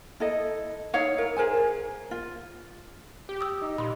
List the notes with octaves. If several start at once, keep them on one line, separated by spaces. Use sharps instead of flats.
E4 A4 D#5
D#4 E4 C#5 F5
E4 A#4
G#4 A#4 C5 G#5
F4
G4
D#6 E6
D#4
A#2 B5 C6